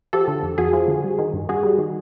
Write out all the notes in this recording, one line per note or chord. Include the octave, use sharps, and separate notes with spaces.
F3 G4 A4
D3
F2
F2 F#4 G#4
F3
D3
G3
D#3
G2
G2 F#4 G#4
G3
D#3